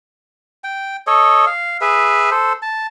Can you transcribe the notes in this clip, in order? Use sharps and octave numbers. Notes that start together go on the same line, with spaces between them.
G5
A4 C#5 D#5
F5
G#4 B4 E5
A4 C5
A5